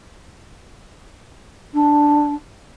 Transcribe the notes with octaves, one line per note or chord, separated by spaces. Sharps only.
D4